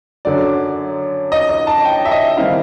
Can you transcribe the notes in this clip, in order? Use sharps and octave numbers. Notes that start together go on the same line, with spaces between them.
F#2 D3 F#3 D5
D#5
D#5
A5
G5
E5
D#5
D#3 G3 C4 E4 F5